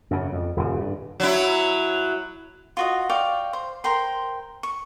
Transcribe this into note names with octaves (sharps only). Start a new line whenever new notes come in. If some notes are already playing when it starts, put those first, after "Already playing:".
F#2 C#3
F2
D#1 F#2 C#3
G2
F#3 E4
F4 F#4 D#5
D5 F5 G5 C#6
C5
A#4 C5 G5 C6
C#6